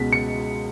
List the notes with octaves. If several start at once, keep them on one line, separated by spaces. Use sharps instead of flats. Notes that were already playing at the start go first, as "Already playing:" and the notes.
Already playing: C#2 B2 G#3 B6
C#7